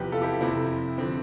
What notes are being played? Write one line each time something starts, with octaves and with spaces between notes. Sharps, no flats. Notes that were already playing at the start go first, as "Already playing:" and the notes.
Already playing: E2 C3 F3 G4 B4
F4 A4
E4 G4
F2 C3 F3 C4 E4
D3 F3 C4